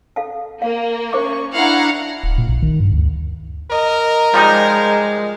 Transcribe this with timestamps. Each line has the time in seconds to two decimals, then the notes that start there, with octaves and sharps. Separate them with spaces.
0.16 A4 F5 A5
0.62 A#3 F5
1.13 C#4 C5 E5 C#6 D6
1.53 D4 E4 F5 F#5 A#5
2.23 D1
2.38 A#2
2.49 A#1
2.62 D#3
2.80 G2
2.93 D2
3.71 A#4 D#5
4.34 F3 G3 G#3 D#4